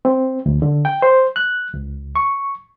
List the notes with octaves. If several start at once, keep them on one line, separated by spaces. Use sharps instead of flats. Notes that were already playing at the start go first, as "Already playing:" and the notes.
C4
D2
D3
G5
C5
F#6
C#2
C#6